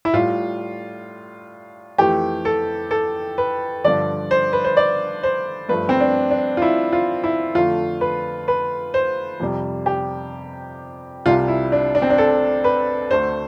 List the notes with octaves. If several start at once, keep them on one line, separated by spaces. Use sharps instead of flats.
E4
A2 G3 F4
F2 E3 A3 G4
A4
A4
B4
G2 D3 F3 D5
C5
B4
C5
D5
C5
G2 F3 A3 B4
C4
D4
D4
F4
E4
F4
E4
F2 D3 A3 F4
B4
B4
C5
F2 C3 G3
G4
C2 C3 G3 F4
E4
D4
D4
C4
D4
A4
B4
D2 D3 A3 C5